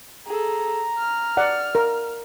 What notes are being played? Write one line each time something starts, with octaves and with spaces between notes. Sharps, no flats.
G#4 A4 A#5
F6
D5 F#5
A#4